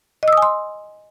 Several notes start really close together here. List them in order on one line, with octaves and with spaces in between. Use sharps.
D#5 E6 D#6 G#5 C6